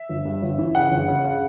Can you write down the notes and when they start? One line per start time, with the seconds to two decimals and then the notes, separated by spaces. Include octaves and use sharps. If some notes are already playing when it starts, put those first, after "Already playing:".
Already playing: E5
0.09 G1
0.25 G2
0.42 G1
0.58 E3
0.75 C#3 F#5
0.91 G1
1.08 C#3
1.24 C#3